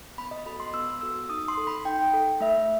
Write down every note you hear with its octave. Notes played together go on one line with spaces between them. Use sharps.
B3 B5
D#5
F#4 A4 B5
C6
B3 E6
F#4 A4 E6
D#4 D#6
C6
A4
B5
D#4 G5
A4
A3 E5